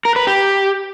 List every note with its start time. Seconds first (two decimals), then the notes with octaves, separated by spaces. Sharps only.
0.05 A#4
0.16 B4
0.27 G4